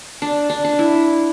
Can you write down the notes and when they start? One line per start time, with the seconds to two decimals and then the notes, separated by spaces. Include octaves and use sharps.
0.22 D4
0.50 D4
0.65 D4
0.79 E4